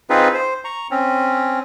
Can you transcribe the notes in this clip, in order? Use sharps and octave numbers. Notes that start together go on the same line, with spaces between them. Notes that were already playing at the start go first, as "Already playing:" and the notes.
C4 D#4 F4 G#4 B4
C5
A#5 C#6
C4 C#4